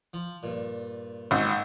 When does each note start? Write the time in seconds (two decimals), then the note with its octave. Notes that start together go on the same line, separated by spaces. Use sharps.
0.13 F3
0.43 G2 A#2
1.31 G#1